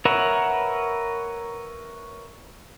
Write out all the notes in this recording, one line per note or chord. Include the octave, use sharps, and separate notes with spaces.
A#4 B4 C#5 E5 F#5